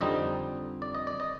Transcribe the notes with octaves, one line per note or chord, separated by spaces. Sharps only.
F2 D3 G3 C4 D#4 D#5
D5
D#5
D5
D#5